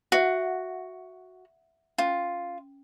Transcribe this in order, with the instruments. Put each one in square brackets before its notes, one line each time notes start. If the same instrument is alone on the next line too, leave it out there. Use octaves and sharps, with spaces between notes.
[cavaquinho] F#4 [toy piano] E5 F#5
[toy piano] C#4 [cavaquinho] F4